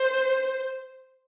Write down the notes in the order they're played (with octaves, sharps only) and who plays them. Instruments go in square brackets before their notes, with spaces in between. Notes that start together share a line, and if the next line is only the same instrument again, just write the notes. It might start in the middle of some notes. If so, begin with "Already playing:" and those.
Already playing: [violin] C5